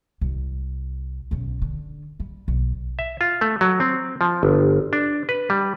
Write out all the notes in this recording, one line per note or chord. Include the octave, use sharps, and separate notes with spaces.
C2
B1 C#3
D3
G3
B1
E5
F4
A3
F#3
C4
F3
G1
D4
B4
G3